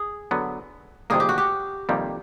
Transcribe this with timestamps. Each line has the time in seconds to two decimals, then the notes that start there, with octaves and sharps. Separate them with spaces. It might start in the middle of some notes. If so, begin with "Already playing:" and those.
Already playing: G#4
0.31 D3 F#3 B3
1.10 F2 C3 D#3 G3 A#3 G#4
1.20 G4
1.29 F#4
1.38 G4
1.89 F2 C3 D#3 G3 A#3